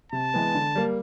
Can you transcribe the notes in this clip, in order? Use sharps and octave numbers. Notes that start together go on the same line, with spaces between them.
C3 A5
E3 G#3 B3
D3
G3 A#3